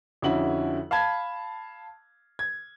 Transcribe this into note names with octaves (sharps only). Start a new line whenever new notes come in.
F2 D3 C#4 E4 F#4 F#7
F5 A5 B5 G#6
G#6